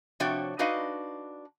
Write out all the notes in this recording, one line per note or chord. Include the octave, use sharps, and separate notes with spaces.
C3 F3 D4 F#4 C#5 G5
D4 D#4 F#4 B4 D#5 F5